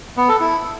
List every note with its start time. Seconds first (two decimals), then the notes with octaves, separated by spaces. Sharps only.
0.17 B3
0.29 A4
0.40 E4